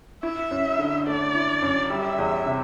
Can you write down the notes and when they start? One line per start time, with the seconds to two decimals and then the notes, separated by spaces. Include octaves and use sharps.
0.23 E4 E5
0.51 F#2
0.79 D3
1.07 A3 D5
1.35 E4
1.62 F#2
1.90 G3 E5
2.18 E2
2.46 C3